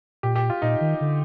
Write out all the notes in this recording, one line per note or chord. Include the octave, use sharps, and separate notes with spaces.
A#2 G4
G4
F4
A#2 D#4
D#3
D3